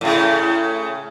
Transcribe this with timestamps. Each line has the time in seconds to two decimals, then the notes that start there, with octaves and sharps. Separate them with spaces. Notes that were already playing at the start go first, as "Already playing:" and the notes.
0.01 A2 C#3